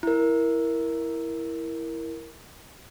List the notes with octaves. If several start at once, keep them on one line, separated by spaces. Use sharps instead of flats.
E4 A#4